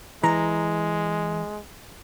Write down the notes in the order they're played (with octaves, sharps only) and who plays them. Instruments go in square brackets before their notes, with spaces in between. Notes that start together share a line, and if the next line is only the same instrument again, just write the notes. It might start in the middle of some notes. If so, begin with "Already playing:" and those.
[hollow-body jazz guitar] E3 [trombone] G#3 [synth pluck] A#5